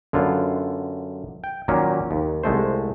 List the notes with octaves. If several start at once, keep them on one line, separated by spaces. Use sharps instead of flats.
F#2 D3 B3 F4
G5
A#2 D#3 F#3 A#3 C#4
D#2
C2 G#3 A3 C5